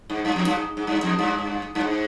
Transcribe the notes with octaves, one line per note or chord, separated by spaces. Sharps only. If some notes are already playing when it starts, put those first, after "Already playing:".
G#2
G2
F2
G2
G#2
G#2
G2
F2
G2
G2
G#2